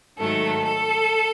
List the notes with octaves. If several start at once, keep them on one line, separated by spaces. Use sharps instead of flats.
G#2 D#3 F#3 A3 A4
A4